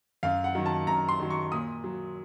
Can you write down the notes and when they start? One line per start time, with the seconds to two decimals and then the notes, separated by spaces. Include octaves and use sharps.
0.23 F#2 F5
0.44 F#5
0.55 D#3 F#3
0.66 A5
0.87 F#2 A#5
1.09 C6
1.20 D#3 F#3
1.31 C#6
1.52 A#2 D#6
1.84 F#3